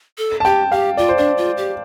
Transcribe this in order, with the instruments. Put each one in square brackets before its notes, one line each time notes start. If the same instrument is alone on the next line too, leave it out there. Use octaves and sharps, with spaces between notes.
[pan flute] A4
[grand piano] A5
[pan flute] G4 [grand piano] G5
[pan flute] G4 [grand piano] F5
[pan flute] F4 [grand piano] D5
[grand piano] C5
[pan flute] D4 [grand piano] D5
[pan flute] F4
G4